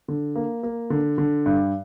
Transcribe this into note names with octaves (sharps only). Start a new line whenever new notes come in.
D3
A#3
A#3
D3
D3
G2